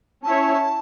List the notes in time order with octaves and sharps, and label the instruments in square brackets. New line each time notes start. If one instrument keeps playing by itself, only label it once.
[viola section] C#4 E4 C#5 E5 [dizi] A5